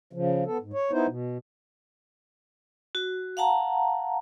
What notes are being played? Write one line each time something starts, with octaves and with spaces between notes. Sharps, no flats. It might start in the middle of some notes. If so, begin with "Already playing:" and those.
C#3 F3
B3 A4
G#2
C#5
B3 D#4 E4 C5
B2
F#4
F5 F#5 A5 A#5